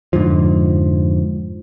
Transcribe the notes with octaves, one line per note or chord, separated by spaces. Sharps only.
F2 G#2 D3 F3